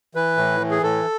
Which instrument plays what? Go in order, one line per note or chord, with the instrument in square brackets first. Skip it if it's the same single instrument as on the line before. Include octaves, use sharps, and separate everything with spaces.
[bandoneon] E3 B4
A2
E3
G#4
A2 A4